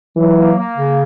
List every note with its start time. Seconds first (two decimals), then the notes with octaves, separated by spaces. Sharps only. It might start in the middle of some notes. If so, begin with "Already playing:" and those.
0.16 E3 F#3
0.36 A#3
0.58 A#3
0.77 C#3